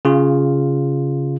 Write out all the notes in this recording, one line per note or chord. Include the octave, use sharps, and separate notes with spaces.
C#3 F4